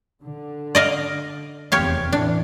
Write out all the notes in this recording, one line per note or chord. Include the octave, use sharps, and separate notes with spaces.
D3
D5 D#5 F5
F1 E2 C4 G4 C#5 F5
E2 A2 E3 D4